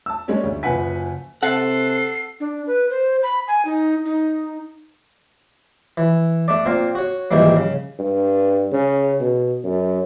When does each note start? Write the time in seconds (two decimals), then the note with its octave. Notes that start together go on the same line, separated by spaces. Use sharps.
0.06 A5 E6
0.28 G3 G#3 A#3 C#4 D4
0.44 D2
0.63 F#1 F3 B4 F#5 G#5 B6
1.43 C3 A4 F#5 C7
2.40 D4
2.67 B4
2.90 C5
3.23 B5
3.48 G#5
3.65 D#4
4.05 D#4
5.97 E3
6.48 A3 D4 D5
6.66 A#2 C4 F5 A#5
6.95 F#4 C#5
7.31 A#1 G#2 D#3 E3 G3 A#3
7.56 C#3
7.99 G2
8.72 C#3
9.20 B2
9.64 F#2